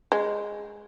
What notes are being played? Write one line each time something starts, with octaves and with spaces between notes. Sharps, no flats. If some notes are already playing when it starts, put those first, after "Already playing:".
G#3